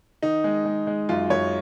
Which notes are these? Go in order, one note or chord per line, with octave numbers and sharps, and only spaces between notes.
D#3 D#4
G#3
G#3
G#3
F#2 F4
F#2 C#5